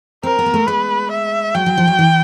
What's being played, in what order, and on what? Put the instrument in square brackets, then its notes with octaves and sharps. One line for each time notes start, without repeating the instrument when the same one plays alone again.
[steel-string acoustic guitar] C4 [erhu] A#4
[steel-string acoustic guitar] B3
A#3
A3
[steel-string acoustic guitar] G#3 [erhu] B4
[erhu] E5
[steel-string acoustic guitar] F#3 [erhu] G5
[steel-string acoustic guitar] F#3
F3
F#3
E3